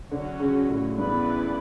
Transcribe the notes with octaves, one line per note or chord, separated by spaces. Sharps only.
D3 F#3 C#4 F#4 C#5
C#3
A2
G2 E3 B3 E4 B4 D5